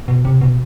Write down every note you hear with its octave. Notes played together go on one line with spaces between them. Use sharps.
B2
C3
B2